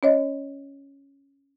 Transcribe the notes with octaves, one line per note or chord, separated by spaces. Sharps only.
C#4 C#5 D#5